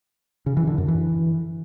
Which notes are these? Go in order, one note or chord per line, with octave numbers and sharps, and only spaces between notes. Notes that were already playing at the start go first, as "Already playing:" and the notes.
C#3
E3
D3
F#2
E3